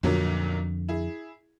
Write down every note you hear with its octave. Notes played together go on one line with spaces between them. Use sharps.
B1 F2 A#2 D3 F#3
E4 G#4